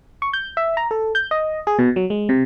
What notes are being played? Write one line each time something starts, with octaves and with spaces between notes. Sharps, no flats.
C#6
G6
E5
A#5
A4
G6
D#5
G#4
B2
F#3
G#3
C3